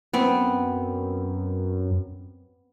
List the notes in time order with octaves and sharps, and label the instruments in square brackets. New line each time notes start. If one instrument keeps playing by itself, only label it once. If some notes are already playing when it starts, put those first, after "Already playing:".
[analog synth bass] F#2 [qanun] B3 C4